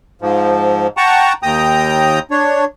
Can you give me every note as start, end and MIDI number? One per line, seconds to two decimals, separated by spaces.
0.22 0.87 44
0.22 0.87 53
0.97 1.33 78
0.97 1.33 79
0.97 1.33 81
0.97 1.33 82
0.97 1.33 85
1.43 2.19 39
1.43 2.19 79
1.43 2.19 82
1.43 2.19 87
2.31 2.65 62
2.31 2.65 73